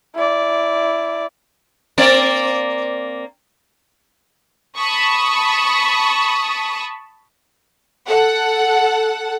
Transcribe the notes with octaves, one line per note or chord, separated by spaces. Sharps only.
E4 D5
A#3 C4 D5
A5 B5 C#6 D#6
A4 F#5